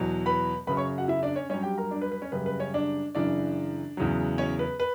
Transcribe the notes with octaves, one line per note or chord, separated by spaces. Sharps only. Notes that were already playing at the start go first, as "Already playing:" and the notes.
Already playing: E2 B2 F#3
B4 B5
F#2 C#3 F#3 B4 B5
C#5 C#6
F#4 F#5
E4 E5
D4 D5
C#4 C#5
G2 F#3 C#4 C#5
G4 G5
A#4 A#5
D4 D5
B4
B4
C#4 C#5
F#2 C#3 G3 B4
B4
C#4 C#5
D4 D5
F#2 C#3 E3 D4 D5
E2 C#3 F#3
C#4 C#5
B4
B4